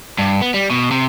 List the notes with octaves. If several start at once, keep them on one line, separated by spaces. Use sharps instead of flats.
G2
B3
G3
B2
C3